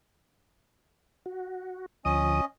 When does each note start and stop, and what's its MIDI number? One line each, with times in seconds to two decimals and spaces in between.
1.26 1.86 66
2.05 2.41 38
2.05 2.41 53
2.05 2.45 61
2.05 2.45 75
2.05 2.41 87